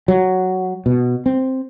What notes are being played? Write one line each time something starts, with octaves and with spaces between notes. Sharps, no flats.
F#3
B2
C4